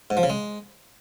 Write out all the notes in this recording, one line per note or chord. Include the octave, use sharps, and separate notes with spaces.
G#2
F3
C#3
G#3